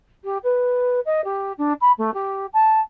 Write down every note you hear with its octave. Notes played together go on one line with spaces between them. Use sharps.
G4
B4
D#5
G4
D4
B5
A3
G4
A5